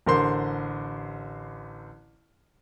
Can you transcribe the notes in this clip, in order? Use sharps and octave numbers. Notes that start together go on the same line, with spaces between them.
A1 D3 A#4 C5 C6